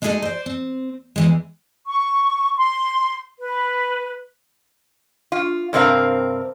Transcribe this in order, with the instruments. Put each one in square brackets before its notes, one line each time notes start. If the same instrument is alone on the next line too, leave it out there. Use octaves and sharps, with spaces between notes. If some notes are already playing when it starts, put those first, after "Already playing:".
[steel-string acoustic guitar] G#3 A3 D#4 G#4 A4 D#5
C5 D5
C4
E2 E3 G#3
[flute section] C#6
C6
B4
[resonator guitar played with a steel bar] F4
G2 C3 C4 A#4 F5